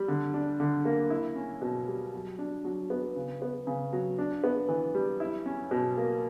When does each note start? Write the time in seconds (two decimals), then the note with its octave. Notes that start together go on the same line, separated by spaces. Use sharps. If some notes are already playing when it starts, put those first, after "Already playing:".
Already playing: G3
0.08 D3
0.34 D4
0.60 D3
0.85 A#3
1.10 E4
1.36 C#4
1.62 B2
1.87 G3
2.14 F#3
2.39 D4
2.65 F#3
2.90 B3
3.16 C#3
3.42 B3
3.67 C#3
3.93 F#3
4.19 D4
4.44 B3
4.69 E3
4.95 G3
5.20 E4
5.46 C#4
5.71 B2
5.97 A#3